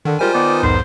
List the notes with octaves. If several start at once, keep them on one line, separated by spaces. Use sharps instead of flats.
D3 D#3
G3 G#3 F4 A#4 C5 G#5
D#3 B3 D5
B1 E2 G#2 C5